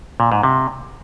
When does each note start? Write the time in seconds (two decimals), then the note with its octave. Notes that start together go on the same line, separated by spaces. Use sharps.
0.20 A#2
0.32 G#2
0.43 C3